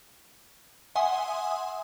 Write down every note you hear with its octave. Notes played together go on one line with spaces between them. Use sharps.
E5 F#5 G#5 C6 D#6